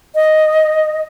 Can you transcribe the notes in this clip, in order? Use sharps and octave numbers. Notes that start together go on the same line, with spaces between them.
D#5